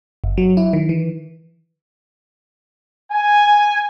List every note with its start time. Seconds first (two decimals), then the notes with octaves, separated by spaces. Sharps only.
0.24 G1
0.38 F#3
0.57 E4
0.73 D#3
0.89 E3
3.11 G#5